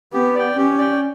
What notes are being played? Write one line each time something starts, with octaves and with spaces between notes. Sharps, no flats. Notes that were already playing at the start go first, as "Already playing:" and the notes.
B3 G4
D5 G5
C#4 G4
D5 G5